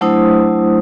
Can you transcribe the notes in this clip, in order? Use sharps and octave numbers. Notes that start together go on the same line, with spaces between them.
F#3 A3 D4 E4 C5 D#6